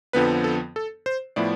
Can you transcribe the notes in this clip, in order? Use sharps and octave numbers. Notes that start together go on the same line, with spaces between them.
F2 D3 F3 B3 B4
A4
A4
C5
A2 F3 B3 E4 D5